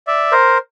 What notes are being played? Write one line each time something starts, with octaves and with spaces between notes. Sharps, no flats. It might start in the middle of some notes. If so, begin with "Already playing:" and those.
D5 E5
A#4 C5